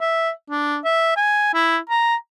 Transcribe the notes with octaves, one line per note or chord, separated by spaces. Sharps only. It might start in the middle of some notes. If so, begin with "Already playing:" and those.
E5
D4
E5
G#5
E4
A#5